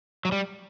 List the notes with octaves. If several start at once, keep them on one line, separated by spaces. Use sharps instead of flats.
F#3
G3